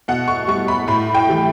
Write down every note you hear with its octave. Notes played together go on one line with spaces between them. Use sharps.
B2 F#5
C#6
G3 C#6
B5
A2 B5
G5
E3 G3